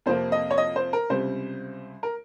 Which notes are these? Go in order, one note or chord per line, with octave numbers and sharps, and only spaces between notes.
F2 C3 F3 A#3 C5
D#5
C#5
D#5
C5
A#4
C#2 C3 G3 C5
A#4